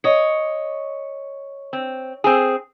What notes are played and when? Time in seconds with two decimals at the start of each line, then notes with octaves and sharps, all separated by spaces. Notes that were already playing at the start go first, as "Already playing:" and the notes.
0.04 C#5 D#5
1.73 C4
2.24 C4 G#4